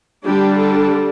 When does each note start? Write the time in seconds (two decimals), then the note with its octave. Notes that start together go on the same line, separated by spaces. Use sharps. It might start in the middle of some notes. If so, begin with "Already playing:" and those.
0.24 D3 G3 D4 G4
0.58 A4